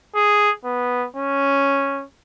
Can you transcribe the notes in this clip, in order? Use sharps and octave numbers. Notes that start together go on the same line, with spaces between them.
G#4
B3
C#4